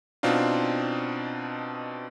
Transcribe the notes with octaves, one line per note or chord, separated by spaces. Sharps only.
B2 C4 D4 D#4 F4